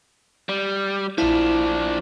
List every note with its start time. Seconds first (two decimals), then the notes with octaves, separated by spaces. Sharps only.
0.49 G3
1.18 A#1 F3 D4 E4